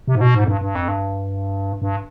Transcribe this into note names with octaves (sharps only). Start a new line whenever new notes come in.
C3
G#2
B2
G#2
F2
G2
G2
F2
G2
G2